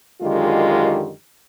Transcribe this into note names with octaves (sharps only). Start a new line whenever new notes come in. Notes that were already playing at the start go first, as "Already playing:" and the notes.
F#2 D3 D#3 G#3 F4 G4